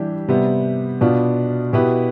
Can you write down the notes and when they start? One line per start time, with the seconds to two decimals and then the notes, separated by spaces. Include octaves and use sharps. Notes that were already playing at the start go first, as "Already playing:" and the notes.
Already playing: E3 G3 D4 G4
0.28 C3 G3 B3
1.01 B2 B3 D4 F4
1.73 B2 B3 E4 G4 B4